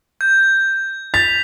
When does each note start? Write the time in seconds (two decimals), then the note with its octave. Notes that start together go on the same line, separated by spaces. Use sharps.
0.21 G6
1.14 A6 B6 F7